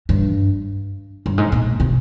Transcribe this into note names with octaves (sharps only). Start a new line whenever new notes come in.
G2
G2
G#2
A#2
C3